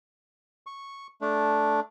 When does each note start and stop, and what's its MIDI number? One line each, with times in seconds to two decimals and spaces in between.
0.67 1.07 85
1.21 1.80 57
1.21 1.80 62